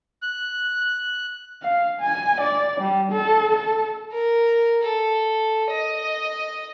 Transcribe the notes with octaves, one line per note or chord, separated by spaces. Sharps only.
F#6
F5
G#5
D5
G3
A4
A4
A#4
A4
D#5